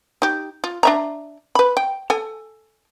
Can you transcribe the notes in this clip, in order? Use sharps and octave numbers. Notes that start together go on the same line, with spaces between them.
D#4 G4
F4
D4 E5 A#5
B4 B5
G5
A4 G#5